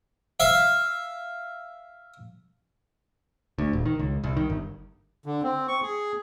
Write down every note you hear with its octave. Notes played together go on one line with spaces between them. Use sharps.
E5 F5
D2
D#1
D#3
C#2
C2
D#3
G1
D3
C4
C#6
G#4